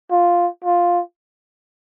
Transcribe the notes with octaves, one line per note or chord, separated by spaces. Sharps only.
F4
F4